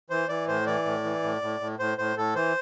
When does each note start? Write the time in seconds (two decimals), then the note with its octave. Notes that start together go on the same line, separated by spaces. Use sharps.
0.10 E3 C5
0.28 E3 D5
0.48 A2 C5
0.66 E3 D5
0.85 A2
1.04 E3
1.23 A2
1.42 A2
1.60 A2
1.79 A2 C5
1.98 A2 C5
2.17 A2 A4
2.35 E3 C5